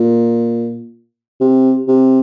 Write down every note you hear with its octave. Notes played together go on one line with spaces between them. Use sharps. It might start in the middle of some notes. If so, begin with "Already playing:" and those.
Already playing: A#2
C3
C3